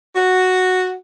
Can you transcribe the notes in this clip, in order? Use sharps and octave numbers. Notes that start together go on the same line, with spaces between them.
F#4